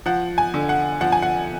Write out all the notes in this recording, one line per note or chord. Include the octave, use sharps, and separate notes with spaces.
F3 F#5
G#5
D3
F#5
F3 F#5
G#5
F#5